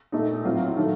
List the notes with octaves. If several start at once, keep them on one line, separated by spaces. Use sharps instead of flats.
A#2 A3 D#4
A2 F#3 C4 F4
D#3 F#3 A3